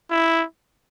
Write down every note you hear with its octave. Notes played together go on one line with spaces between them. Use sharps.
E4